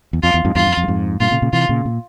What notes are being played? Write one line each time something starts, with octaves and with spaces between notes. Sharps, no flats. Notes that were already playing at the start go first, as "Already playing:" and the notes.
E2
F2 F4
E2
F2 G#2
E2 G2 F4
F2
F2
G2
F2 G#2
G2 A#2 F4
A#2 C#3
A#2 C#3
C3 E3 F4
A#2 C#3
A#2